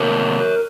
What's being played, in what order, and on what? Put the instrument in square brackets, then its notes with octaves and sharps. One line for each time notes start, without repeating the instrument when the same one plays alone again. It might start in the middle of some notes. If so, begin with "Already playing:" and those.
Already playing: [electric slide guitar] C3 D#3 A#3 A#4 C#5